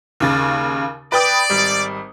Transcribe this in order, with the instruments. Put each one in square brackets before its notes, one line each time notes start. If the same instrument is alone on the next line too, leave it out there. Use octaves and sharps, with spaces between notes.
[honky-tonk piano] D#2 C#3 A6
[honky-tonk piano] B4 G5 D#6 [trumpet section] D5
[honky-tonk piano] G#1 G3